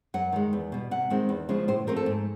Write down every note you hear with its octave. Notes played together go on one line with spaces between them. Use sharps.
F#2 F#5
D#3 G#3
E2
B2 G3
C3 F#5
D#3 G#3 C4
E2
C#3 F3 G#3 C#4
A2 C5
F3 A3 C4 A#4
A4
G#2